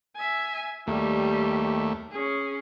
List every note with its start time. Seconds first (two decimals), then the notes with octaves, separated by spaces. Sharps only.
0.16 E5 G#5
0.87 D#2 G3 A3 G4
2.11 C#4 G#4